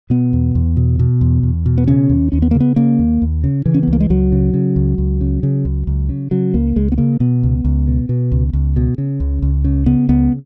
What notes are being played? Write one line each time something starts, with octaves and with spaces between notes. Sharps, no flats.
B2 B3
E2
E2
B2
B2
E2
E2
B2
B3
C#3 C#4
D#2
D#2 C#4
B3
C#3 A#3
B3
C#3 A#3
D#2
D#2
C#3
C#3 E3
C#4
B3
C#2
A#3
G#3
C#2 F#3
C#3
C#3
C#2
C#2
C#3
C#3
C#2
C#2
C#3
C#3 F#3
C#2 A#3
C#2 G#3
B3
C#3 A#3
B2 B3
C#2
C#2
B2
B2
C#2
C#2
B2
C#3
C#2
C#2
C#3
C#3 B3
C#2 B3